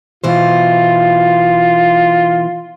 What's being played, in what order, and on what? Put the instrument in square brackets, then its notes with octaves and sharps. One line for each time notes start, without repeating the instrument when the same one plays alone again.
[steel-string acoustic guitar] B2 E3 C5 [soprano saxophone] F4